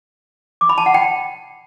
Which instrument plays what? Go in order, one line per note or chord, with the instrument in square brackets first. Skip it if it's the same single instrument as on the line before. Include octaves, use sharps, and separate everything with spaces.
[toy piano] D6
B5
A5
F#5
G5